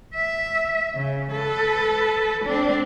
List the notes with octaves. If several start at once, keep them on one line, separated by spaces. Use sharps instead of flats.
E5
C#3
A4 B4
C4 D4